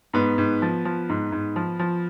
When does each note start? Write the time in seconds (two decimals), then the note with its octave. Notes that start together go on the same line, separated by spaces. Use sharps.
0.13 G#2 B3
0.38 G#2
0.62 F3
0.85 F3
1.09 G#2
1.32 G#2
1.56 F3
1.79 F3